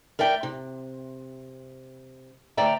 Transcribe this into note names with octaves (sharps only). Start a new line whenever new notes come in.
A#4 D5 E5 G5
C3
D2 D5 E5 G5 A#5